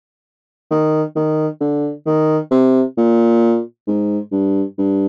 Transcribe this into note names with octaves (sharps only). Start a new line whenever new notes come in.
D#3
D#3
D3
D#3
C3
A#2
G#2
G2
G2